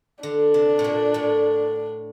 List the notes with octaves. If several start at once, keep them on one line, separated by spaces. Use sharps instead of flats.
D3 D4
C3
A2
A#2
A2